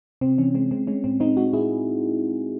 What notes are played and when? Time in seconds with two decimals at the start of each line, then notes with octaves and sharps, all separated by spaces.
0.21 C3 C4
0.38 E3 C#4
0.54 G#3 C4
0.71 G#3 C4
0.87 G#3 C#4
1.04 A2 C4
1.20 G#3 C4 D#4
1.37 G#3 D#4 F#4
1.53 A2 E4 G#4